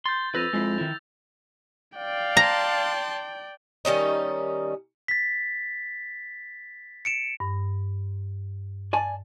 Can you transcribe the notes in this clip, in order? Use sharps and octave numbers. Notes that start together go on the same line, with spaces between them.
C6 G6 A6
F2 B4 E6 A#6 F7
F2 G#3 E4
D#3 E4
D5 F5 G5
A5 A#5 C6
D#3 G3 C#4 D#4
A6 B6
C#7 D7 E7
G2
D5 G#5 A5